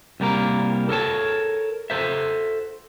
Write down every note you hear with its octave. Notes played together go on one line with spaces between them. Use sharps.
C2 G3 A#3 A#4
A4 A#4 C#5 A5
A4 C5 E5